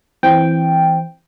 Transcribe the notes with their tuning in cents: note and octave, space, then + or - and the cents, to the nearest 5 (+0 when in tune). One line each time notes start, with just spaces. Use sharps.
E3 +0 C4 +0 G5 +0